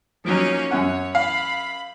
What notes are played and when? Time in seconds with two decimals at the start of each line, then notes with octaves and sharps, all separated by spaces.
0.25 F3 F#3 A#3 C#4 D#4
0.71 F#2 C#4 C#5 F#5
1.15 F5 B5